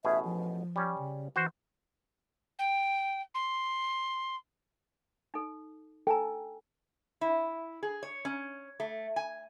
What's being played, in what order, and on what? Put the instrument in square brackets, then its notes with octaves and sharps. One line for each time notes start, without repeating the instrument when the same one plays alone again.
[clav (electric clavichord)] A1 B2 G#4 [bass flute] E5
[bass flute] F3
[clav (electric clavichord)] G3 C#4
[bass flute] C#3
[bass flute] E3 [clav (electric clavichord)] F#4 C5
[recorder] G5
C6
[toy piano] D#4 A4
[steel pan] A4 [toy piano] G5 G#5 A#5
[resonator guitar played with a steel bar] E4
G#4
C#5
C#4
A3
G#5